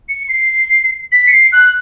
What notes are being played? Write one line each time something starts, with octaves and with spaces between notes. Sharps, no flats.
C#7
C7
B6
C#7
C7
F#6